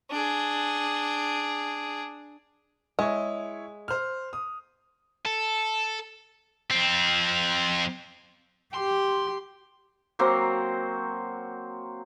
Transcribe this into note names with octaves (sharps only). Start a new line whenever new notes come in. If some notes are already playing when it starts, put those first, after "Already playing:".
D4 G#4
G#3 E4 C#5
C5 F6
D#6
A4
F2 C4
G4 C6
F#3 A#3 C4 C5